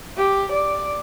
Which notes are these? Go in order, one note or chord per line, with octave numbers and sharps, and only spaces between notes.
G4
D5